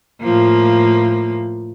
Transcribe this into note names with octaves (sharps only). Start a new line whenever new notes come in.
A2 F3 A#3